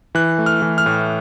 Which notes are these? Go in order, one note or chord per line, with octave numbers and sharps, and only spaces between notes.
E3 F#6
A3
F6
E3
F6
A2